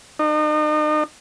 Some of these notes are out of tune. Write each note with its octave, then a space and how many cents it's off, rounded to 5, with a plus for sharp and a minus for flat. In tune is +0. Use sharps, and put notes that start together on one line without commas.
D#4 -40